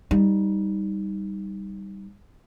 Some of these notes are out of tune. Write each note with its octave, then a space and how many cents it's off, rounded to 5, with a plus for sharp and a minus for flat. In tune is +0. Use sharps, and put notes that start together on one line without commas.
G3 +0 D#4 +0